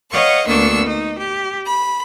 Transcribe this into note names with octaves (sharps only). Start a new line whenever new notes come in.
B4 C#5 D#5 F5 F#5 C#6
D2 A#3 B3 D4 C#6 E6
D#4
G4
B5